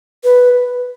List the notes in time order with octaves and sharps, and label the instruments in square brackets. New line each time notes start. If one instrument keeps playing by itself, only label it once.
[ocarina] B4